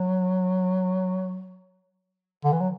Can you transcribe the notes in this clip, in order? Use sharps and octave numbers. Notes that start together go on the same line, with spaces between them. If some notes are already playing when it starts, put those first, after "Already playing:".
Already playing: F#3
D3
E3
F#3